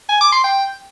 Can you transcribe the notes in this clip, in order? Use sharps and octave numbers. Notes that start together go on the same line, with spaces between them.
G#5
D6
C6
G5